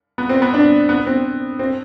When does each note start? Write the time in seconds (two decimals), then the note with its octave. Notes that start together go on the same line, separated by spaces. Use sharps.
0.18 B3
0.29 C4
0.42 B3
0.54 D4
0.89 B3
1.07 C4
1.59 C4